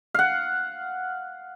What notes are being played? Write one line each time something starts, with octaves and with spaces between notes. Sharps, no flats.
F5 F#5